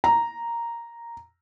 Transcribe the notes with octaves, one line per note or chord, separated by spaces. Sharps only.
A#5